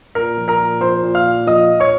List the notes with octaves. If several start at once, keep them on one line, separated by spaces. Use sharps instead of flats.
A#2 A#4 A#5
F3
A#4 A#5
A#2
F3 C5 C6
A#2
F5 F6
A#2
F3 D#5 D#6
A#2
C#5 C#6